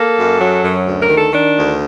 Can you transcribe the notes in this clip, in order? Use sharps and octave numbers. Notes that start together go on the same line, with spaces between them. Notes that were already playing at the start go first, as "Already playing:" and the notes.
Already playing: A#3 A4
F#2
F#3
F#2
D2
A#4
D#3
A4
D#3 D4
D2